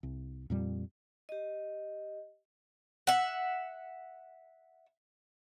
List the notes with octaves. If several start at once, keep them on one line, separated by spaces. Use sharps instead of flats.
C2
F2 A#2 G3
G4 D#5
E5 F#5